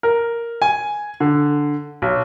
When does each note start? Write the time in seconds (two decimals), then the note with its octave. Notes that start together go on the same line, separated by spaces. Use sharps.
0.03 A#4
0.62 G#5
1.20 D3
2.02 B1